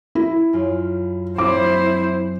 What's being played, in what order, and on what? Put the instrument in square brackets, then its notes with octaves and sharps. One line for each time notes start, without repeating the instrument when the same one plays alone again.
[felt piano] E4
[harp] F#2 F4
[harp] F#3 C4 [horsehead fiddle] E4 C5 [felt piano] D6